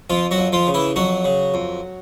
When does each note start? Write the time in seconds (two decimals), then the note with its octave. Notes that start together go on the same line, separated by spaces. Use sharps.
0.10 F2 F3 F4
0.31 F#3 F#4
0.38 F2
0.53 F3 F4
0.67 C#3
0.74 E3 E4
0.96 F2 F#3 F#4
1.25 C#3
1.54 F2